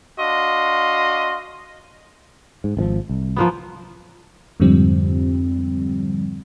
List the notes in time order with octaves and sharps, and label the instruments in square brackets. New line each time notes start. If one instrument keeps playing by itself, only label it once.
[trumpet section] D4 F#4 D#5 F5 C6
[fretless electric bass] G#2
G#1 D#3 F3
C2
[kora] F3 A#3 B3
[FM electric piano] F2 G#2 D3 F3 G3 C4